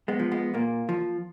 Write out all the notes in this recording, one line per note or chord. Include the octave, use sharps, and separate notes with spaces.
G#3 B3
F3
G#3 B3
A#2 A#3
F3